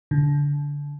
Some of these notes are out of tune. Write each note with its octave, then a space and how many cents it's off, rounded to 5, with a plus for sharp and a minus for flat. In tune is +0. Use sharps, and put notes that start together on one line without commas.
D3 -25